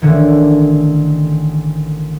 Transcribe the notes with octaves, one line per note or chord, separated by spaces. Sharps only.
A1 D3 D#3